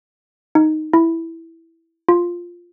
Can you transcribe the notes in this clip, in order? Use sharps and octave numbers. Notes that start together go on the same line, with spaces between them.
D#4
E4
F4